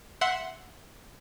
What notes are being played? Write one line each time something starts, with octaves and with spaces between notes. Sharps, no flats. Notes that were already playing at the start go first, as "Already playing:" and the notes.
E5 F#5 C6